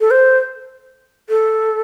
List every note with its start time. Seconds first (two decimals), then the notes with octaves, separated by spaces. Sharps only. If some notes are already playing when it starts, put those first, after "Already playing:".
0.01 A4
0.11 C5
1.29 A4